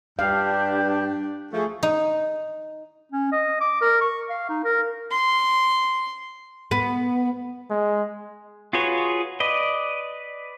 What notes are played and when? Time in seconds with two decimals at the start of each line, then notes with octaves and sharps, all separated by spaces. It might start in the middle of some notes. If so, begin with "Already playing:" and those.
0.19 G2 D4 G4 F5 G6
1.52 D2 F3 A3 G#4 C#6
1.83 D#4
3.12 C#4
3.32 D#5
3.61 D6
3.81 A#4
4.01 C#6
4.30 F5
4.49 D#4
4.64 A#4
5.11 C6
6.71 B3
7.70 G#3
8.73 F4 F#4 G#4 B4 C#5
9.40 B4 D5 D#5